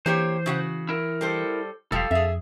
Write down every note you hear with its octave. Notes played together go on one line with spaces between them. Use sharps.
E3 A#3 G4 C5 C#5
C#3 F#4 F#5
E4 A#4
G3 A4 C5
E1 F3 G3 A4 F5
F2 G#4 E5